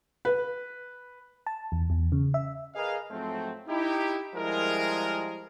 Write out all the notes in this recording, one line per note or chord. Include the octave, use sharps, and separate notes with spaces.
B4
A5
E2
E2
C#3
E5
G#4 A#4 B4 D#5 F5
G#2 F3 F#3 A3 C4
D#4 E4 G4
F3 G3 G#3 E4 G#4 A#4